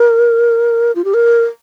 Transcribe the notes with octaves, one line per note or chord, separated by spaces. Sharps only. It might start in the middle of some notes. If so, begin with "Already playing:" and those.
Already playing: A#4
F4
G4
A#4